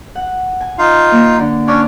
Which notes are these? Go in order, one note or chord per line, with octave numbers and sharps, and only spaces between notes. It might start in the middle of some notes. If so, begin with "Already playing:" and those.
F#5
G#5
D#4 F4 F5
A#3
D3
C#4 D4 C#5 D5